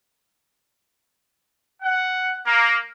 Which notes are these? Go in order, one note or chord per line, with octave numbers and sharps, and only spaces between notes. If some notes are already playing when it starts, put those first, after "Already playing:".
F#5
A#3